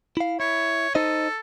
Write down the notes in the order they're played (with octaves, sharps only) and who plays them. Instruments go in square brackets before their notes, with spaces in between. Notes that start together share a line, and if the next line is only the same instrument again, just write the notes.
[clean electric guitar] E4 F5
[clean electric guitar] E4 [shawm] C#5
[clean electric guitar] D#4 C5 D#5 [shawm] A4